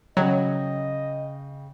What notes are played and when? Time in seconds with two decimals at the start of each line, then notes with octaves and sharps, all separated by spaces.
0.17 C#3 F#3 D#5 G5